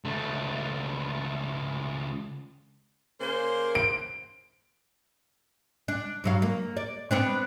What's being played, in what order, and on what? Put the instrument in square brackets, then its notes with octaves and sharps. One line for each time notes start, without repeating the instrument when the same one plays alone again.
[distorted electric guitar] C#2 A3
[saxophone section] C#3 A#3 C5
[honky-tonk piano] D7
[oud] D4
G2 F#3 F5
A#3
D5
B3 C4 D4